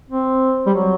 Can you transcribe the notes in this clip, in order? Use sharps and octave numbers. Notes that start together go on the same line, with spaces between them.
C4
G3
F#3